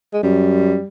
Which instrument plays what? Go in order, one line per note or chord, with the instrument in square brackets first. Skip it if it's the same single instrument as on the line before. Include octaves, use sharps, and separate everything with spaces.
[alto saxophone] G#3
[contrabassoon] F#2 [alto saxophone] G3